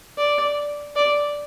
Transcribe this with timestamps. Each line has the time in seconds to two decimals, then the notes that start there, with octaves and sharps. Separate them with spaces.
0.17 D5
0.96 D5